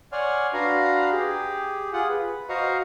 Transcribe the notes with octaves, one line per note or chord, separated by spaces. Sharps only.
C#5 D5 F#5 G#5 C6 F6
D4 F#4 B4 F5 A#5 C6
G4 G#4
F4 G#4 F#5
B4
F#4 C5 D#5 F5 A#5 C#6